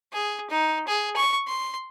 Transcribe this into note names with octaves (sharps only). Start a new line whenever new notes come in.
G#4
D#4
G#4
C#6
C6